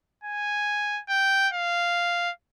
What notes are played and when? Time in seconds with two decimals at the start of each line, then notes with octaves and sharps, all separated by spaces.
0.24 G#5
1.09 G5
1.53 F5